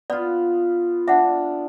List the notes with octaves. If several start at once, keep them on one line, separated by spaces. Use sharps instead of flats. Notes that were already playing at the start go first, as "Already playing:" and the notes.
B3 F4 D5
D4 E5 F#5